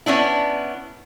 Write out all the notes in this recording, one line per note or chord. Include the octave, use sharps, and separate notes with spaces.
B3 C#4 D4 E4